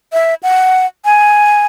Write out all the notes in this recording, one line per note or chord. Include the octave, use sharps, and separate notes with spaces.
E5
F#5
G#5